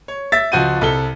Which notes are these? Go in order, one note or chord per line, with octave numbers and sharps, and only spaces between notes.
C#5
E5 A6 B6
C#2 F3 F#4 G6 D#7
C2 A4 G7